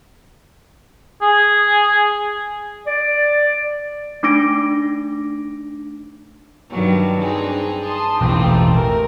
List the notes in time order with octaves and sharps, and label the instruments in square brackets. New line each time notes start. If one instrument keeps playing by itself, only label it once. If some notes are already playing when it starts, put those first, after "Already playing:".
[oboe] G#4
[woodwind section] D5
[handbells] A3 D4 D#4 D6 A#6 D7
[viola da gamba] G2 D#3 F#3
[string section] C4 D4 [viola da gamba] D#4 G#4
[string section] A5 C6 D#6
[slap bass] E1 A1 [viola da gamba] E3 A3 C4 [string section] D#4 F4 G4
[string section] C3 A#4